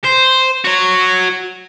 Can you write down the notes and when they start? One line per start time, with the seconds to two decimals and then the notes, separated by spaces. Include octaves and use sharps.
0.05 C5
0.65 F#4 C#5